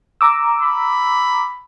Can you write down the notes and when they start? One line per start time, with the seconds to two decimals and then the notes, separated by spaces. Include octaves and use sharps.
0.21 A#5 D6 E6
0.62 B5